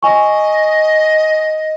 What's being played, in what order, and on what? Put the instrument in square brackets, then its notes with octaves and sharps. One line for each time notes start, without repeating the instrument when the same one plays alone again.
[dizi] D#5 [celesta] G#5 C#6